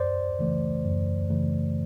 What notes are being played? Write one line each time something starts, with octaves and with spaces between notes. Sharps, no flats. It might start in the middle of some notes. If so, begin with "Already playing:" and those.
Already playing: F#2 C5 D5
C#3 E3 A3
F#2
C#3 E3 A3